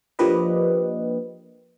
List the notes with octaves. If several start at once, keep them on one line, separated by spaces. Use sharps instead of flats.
F3 A#3 D4 G4 B4 D#5